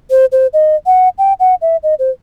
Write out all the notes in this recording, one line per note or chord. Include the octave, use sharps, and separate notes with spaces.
C5
C5
D#5
F#5
G5
F#5
E5
D#5
C5